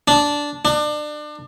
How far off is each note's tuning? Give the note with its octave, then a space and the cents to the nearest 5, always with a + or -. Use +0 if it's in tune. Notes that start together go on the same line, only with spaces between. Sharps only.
D4 -10
D4 +30